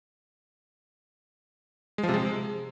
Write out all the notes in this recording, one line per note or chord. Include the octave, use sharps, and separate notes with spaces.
G#3
F3
C3
G#3